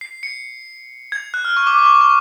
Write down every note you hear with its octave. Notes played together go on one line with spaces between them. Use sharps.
C7
C#7
G#6
F#6
F6
C#6
D6
D6
C#6
C#6